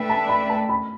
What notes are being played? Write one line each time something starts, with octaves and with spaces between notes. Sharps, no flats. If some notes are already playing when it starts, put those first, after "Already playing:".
Already playing: A3 D4 B4 E5 G5
A5
B5
A5
B5